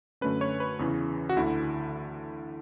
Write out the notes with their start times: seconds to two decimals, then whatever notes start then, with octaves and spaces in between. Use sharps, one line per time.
0.21 F#2 D3 A3 C#4 B4
0.41 C#5
0.60 B4
0.79 E2 C#3 E3
1.29 F#4
1.37 D2 D3 A3 E4